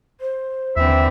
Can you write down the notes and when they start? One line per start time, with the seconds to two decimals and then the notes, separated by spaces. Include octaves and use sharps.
0.21 C5
0.76 D#2 D3 E3 C4 E5